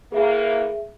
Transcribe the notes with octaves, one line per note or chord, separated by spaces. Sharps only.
A2 E3 A#3 G#4 E5